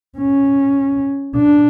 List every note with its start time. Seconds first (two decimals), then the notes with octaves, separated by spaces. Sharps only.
0.18 C#4
1.36 D4